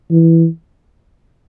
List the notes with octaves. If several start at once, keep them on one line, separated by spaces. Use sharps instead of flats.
E3